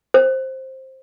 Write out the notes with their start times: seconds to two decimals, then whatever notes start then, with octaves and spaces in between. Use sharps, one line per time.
0.14 C5